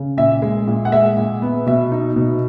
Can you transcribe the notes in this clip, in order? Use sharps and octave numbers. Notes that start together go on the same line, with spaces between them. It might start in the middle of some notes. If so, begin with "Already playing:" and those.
Already playing: C#3
A#2 E5
G#3
A#2
F#5
G#3 E5
A#2
B3
B2 E5
D#4
B2